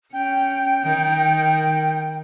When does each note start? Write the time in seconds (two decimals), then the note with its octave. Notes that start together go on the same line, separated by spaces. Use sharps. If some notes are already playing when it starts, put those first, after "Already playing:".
0.13 C#4 G5
0.84 D#3